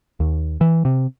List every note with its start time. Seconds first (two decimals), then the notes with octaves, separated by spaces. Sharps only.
0.20 D#2
0.61 E3
0.85 C3